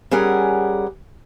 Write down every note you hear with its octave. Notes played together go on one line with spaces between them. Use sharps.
G3 C#4 G#4 A#4 F#5